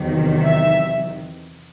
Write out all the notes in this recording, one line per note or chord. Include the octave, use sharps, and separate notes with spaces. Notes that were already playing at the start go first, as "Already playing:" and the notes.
Already playing: E2 C3 D#3 F#3
E5